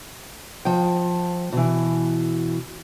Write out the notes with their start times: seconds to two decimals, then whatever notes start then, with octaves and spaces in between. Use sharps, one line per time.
0.65 F3 G5
1.52 B2 E3